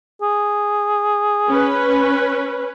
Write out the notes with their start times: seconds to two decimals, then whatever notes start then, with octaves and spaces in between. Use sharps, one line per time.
0.22 G#4
1.49 C#4 B4